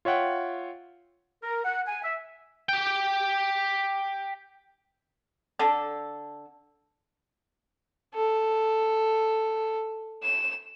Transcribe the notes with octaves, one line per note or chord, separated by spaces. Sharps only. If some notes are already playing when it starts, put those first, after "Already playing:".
F4 C#5 E5 F#5 G5
A#4
F#5
G#5
E5
G4 G5
D3 A4
A4
E7